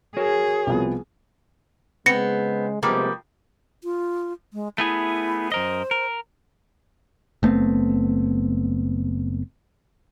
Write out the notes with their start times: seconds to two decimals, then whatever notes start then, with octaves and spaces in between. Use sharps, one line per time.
0.17 F#4 G#4 A#4 C#5
0.67 C2 F3 B3
2.06 C#3 G#3 B3 C4 A#6 C#7
2.83 C3 F3 G3 G#3 A#3 B3
3.84 F4
4.53 G#3
4.78 A3 B3 E4 G#4
5.52 F#2 A#4 C5 D#5
5.91 A#4
7.43 F#1 A3 B3 C4